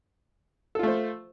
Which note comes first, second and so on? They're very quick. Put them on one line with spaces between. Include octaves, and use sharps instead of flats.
A4 F4 A3 C5